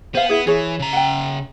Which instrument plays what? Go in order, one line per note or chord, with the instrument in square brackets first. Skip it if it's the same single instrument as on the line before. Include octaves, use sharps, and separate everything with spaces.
[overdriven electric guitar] B3 [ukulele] C5 F5
[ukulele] E4 G#4
[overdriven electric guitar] E3 [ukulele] G#4 C#5
[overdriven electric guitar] C#3 A#5
[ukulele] F#5 G5